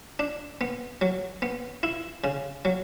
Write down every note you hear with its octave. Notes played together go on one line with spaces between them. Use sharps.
D4
B3
F#3
B3
E4
C#3
F#3